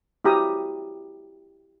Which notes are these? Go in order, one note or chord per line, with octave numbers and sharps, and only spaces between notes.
E4 F#4 G4 A#5 D#6